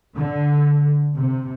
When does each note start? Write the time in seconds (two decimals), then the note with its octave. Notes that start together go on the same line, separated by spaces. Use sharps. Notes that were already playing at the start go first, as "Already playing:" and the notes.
0.15 D3
1.15 C3